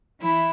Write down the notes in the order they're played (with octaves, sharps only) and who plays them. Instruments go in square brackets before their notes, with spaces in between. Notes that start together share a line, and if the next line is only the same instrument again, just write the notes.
[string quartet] E3 E4